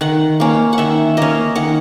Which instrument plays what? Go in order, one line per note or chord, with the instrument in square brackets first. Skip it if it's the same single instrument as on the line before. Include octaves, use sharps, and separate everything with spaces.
[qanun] D#3 F#5
A#3 C#4
F#5
D#3 E5
A#3 C#4 D#5
D#3 F#5